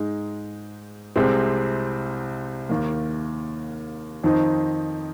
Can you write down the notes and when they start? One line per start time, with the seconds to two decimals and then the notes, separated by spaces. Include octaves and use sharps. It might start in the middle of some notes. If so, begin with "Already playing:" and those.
Already playing: G#2 G#3 D#4
1.16 C2 C3 G#3 C4
2.69 D#2 D#3 A#3
4.24 F2 D#3 C4 D#4